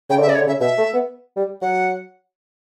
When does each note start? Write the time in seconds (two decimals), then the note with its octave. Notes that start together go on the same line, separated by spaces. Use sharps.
0.10 C#3 G5
0.19 D3 E5
0.28 C#3 D5
0.35 C#5
0.38 D3
0.47 C#3 E5
0.60 B2 E5
0.78 A3
0.94 B3
1.36 G3
1.62 F#3 F#5